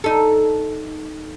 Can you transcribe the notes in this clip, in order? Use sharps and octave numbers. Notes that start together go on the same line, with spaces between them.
D#4 A4